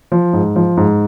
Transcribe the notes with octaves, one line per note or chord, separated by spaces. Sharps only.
F3
G#2
F3
G#2